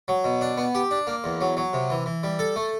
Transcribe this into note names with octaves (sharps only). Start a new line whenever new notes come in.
F#3
B2
D4
B3
G4
D4
A#3
E2
F#3
F#3
C3
E3
E3
G3
A4
A3